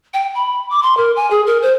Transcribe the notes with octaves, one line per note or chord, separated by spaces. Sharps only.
G5
B5
D6
C6
A#4
G#5
G#4
A#4
C5